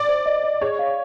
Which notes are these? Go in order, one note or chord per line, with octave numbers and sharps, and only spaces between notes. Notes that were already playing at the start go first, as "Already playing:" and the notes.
Already playing: D5
C5
D#5
D#5
G#4 C#5
F5